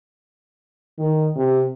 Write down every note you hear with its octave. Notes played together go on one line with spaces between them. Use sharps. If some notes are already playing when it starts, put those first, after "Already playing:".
D#3
C3